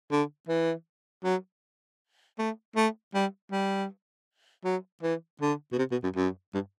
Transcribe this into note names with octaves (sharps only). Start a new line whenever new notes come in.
D3
E3
F#3
A3
A3
G3
G3
F#3
E3
D3
B2
C3
B2
F#2
F#2
G2